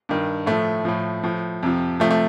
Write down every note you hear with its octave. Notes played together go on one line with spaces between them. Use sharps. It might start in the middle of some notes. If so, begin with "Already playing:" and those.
G2 D#3
A2 F3 A3
A2 F3
A2 F3
F2 C3 F3
C3 F3 A3
A3